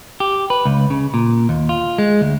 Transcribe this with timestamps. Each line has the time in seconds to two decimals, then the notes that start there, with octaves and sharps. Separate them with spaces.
0.20 G4
0.50 B4
0.65 C#2
0.90 C#3
1.14 A#2
1.49 D#2
1.69 F4
1.98 G#3
2.21 D2